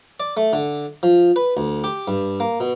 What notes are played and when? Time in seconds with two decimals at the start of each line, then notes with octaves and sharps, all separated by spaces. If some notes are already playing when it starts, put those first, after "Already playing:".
0.20 D5
0.37 A3
0.53 D3
1.03 F3
1.36 B4
1.57 D2
1.84 G4
2.08 G2
2.40 A#3
2.60 B2